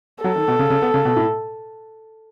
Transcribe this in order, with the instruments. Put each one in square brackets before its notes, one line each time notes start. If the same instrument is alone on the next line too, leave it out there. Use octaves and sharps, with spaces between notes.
[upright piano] F#3 [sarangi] A4
[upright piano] D#3
B2
C#3
C#3
B3
C#3
B2
A2